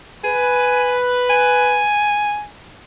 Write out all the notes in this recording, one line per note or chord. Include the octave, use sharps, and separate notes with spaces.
B4 G#5
G#5